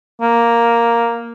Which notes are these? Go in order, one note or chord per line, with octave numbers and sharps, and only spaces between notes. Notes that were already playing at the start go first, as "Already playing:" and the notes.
A#3